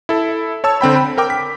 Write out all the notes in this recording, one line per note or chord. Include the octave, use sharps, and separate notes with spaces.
E4 A4
C#5 A5 E6
D3 C4 G5 B5
B5
A#4 G5 D6
B6